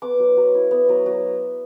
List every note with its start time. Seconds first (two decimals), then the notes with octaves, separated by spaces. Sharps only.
0.02 B3 D6
0.19 F#3
0.37 F#3
0.54 E4
0.71 B3
0.89 F#3
1.06 F#3